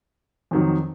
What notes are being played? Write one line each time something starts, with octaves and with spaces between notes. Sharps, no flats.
F2 D#3 F#3